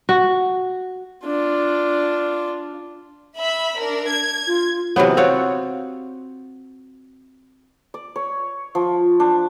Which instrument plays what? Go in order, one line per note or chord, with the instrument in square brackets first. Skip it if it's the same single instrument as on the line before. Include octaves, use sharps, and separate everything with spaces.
[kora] F#4
[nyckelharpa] D4 F4
[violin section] E5 B5
D4 A#4
G#6
[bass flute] F4
[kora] C3 E3 F#3 B3
C4 F4 F#4 C#5
[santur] D5
C#5
F3
D4